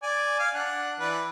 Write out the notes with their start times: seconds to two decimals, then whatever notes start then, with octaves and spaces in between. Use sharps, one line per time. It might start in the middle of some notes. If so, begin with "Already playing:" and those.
0.03 D5 G#5
0.39 F5 G#5
0.55 D4 F#5
1.00 E3 B4 D5